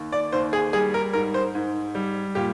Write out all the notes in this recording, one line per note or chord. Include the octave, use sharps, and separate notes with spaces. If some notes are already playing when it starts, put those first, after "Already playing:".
Already playing: D#2
D5
D#2 C5
G#4
G3 G#4
A#4
G#2 A#4
C5
G#2
G3
A#2 G4